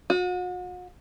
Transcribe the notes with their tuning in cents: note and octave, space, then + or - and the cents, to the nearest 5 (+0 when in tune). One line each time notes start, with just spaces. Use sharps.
F#4 -40